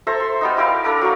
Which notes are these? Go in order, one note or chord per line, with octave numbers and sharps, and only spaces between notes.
A4 C5 E5 A#5
C6
G3 B3 D#4
E4 G4 A#4 F5
D4 A4 A#4
F#3 A#3